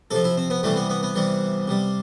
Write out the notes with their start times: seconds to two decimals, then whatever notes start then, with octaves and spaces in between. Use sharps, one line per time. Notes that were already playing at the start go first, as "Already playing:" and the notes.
0.11 C3 F3 A4
0.24 E4
0.38 C4
0.50 B3
0.63 C3 E3 G3 A3
0.76 B3
0.90 B3
1.03 B3
1.16 C3 E3 G3
1.68 C3 G3